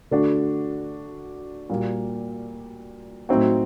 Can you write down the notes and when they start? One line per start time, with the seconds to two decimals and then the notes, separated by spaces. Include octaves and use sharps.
0.11 D3 A3 D4 F#4
1.70 A#2 G3 A#3 F#4
3.29 A2 F#3 C4 D#4 F#4